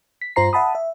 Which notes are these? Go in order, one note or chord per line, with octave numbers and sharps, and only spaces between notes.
B6
G2 F4 C5 A#5 C7
E5 F#5 A5 B5 D#6
E5